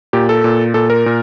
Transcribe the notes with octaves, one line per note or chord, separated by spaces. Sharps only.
A#2 G4
A4
A#2
A#2 A4
A#4
A#2